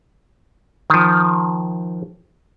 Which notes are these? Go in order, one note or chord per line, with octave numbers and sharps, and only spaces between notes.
D#3 F3